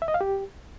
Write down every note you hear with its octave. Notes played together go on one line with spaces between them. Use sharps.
E5
D#5
F5
G4